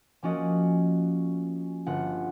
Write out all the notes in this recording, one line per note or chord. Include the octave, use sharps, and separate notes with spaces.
F3 A#3 C#4 F#4 D5 D#5
G1 F4 F#5